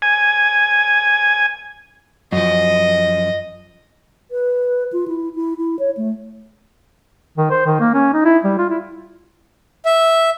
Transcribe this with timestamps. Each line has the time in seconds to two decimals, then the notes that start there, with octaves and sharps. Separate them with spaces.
0.02 G#5
2.32 F#2 F3 D#5
4.31 B4
4.93 F4
5.08 E4
5.35 E4
5.57 E4
5.79 C#5
5.97 A3
7.37 D#3
7.50 C5
7.66 D#3
7.80 A#3
7.94 C#4
8.13 D#4
8.25 E4
8.44 G3
8.58 F4
8.69 E4
9.85 E5